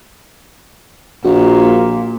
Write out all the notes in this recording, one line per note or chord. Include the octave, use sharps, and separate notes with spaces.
A#1 A#2 A#3 F#4